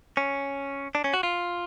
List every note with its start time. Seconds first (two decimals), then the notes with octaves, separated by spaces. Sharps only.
0.17 C#4
0.95 D4
1.04 C#4
1.14 F#4
1.23 F4